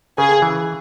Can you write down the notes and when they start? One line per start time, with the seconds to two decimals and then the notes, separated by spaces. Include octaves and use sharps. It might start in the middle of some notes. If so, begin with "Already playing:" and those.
0.18 C#3 G#4
0.42 E3